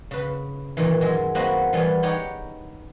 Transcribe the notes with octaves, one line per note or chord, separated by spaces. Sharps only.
C#3 B4
A#2 D#3 E3
F#2 G#3
A#3 C4 F#4 B4 D#5
E3 G3 B3 G#4
D#4 G4 C#5 F#5 G5